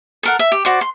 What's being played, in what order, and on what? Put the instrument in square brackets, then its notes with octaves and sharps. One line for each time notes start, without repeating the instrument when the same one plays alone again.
[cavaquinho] A4 A#4 F#5
E5
G4
F#4 C5 D5
C6